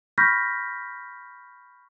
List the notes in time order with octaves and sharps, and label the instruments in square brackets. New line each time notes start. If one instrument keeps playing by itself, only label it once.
[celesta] B5 C#6 F6 G6 A#6 B6